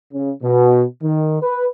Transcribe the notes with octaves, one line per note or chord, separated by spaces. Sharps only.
C#3
B2
D#3
B4